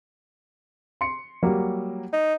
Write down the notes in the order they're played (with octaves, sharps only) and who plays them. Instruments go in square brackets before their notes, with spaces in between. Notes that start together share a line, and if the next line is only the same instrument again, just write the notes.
[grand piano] C6 C#7
F#3 G3 A#3
[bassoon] D#4